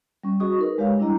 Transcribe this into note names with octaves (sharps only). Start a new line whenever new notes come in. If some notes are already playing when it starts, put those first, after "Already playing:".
G3 C#4
F#4 G#4 D#5 C#6 D#6
D#4 A#4 B4
G#3 G4 C#5 F5
G3 D4 E4 D#5 A#5